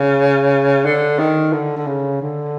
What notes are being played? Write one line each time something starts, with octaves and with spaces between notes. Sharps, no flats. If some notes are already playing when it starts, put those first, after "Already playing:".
Already playing: C#3
D3
D#3
D3
D3
C#3
D3